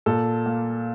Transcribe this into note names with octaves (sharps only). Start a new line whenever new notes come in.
A#2 A4
A#3